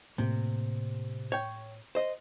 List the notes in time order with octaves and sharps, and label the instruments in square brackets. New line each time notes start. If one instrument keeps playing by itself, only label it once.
[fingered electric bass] A2 A#3 [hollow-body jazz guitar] C3
[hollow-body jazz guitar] C#5 G5
C5 D#5